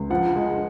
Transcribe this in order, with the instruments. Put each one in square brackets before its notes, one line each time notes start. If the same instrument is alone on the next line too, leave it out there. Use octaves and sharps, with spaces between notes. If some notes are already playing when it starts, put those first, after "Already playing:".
Already playing: [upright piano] C#2
F3 F#5
G#3